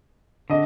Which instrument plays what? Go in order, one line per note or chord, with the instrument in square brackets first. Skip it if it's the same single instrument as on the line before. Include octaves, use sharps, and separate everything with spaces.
[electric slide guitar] D3 [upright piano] D#5